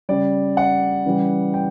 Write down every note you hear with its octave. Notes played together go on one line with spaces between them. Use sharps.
C#3 G3 D5
F#5
C#3 E3 G3
G5